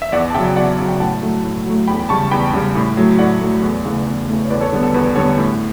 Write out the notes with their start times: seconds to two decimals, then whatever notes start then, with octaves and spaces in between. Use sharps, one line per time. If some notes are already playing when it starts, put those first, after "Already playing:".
0.02 E5
0.12 E2 D5 F#5
0.30 A5
0.34 C#3 F#3 E5 G5
0.56 E2 D5 F#5
0.79 C#3 F#3
0.88 G5
1.00 A2 F#5 A5
1.22 F#3 A3
1.44 A2
1.66 F#3 A3
1.87 E2 G5 B5
2.09 C#3 G3 A5 C#6
2.31 E2 G5 B5
2.53 C#3 G3
2.75 A2
2.97 F#3 A3
3.19 A2 D5 F#5
3.41 F#3 A3
3.63 E2
3.85 C#3 E3 A3
4.06 E2
4.28 C#3 E3 A3
4.45 C#5
4.50 E2 B4 D5
4.61 A4 C#5
4.72 D3 G3 B3
4.83 A4
4.94 E2 B4
5.16 D3 G3 B3 A4 C#5
5.38 A2